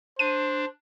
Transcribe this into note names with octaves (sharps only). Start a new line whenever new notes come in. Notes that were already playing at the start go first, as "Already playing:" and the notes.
D4 C5 D#7